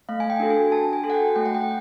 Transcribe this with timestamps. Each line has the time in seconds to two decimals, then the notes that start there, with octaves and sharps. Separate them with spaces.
0.09 A3 F5
0.20 G#5
0.30 G5
0.40 D4 F#4 A4
0.50 G#5
0.72 D4 A5
0.93 G#5
1.04 F#4 A4
1.10 F#5
1.14 G5
1.36 A3 G5
1.46 F#5
1.54 G5